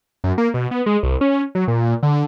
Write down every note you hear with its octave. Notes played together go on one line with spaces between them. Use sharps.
F#2
A#3
B2
B3
G#3
C2
C#4
F#3
A#2
D3